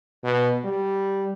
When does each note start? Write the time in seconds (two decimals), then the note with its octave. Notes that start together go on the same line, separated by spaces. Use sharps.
0.24 B2
0.64 G3